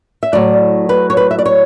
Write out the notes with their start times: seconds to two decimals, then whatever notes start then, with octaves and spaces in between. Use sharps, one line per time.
0.23 E5
0.33 A2 F#3 D5
0.89 B4
1.10 C#5
1.17 B4
1.31 E5
1.39 D5
1.46 C#5